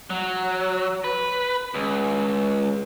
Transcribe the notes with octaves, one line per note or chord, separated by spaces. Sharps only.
F#3
B4
C#2